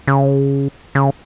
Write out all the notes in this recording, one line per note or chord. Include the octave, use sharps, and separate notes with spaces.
C#3
C#3